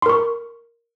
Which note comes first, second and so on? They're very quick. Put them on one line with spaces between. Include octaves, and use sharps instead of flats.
C6 A#4 C#6